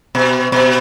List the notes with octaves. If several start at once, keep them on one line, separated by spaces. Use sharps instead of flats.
B2
B2